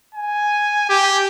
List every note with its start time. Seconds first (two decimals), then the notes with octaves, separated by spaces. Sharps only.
0.15 G#5
0.89 G4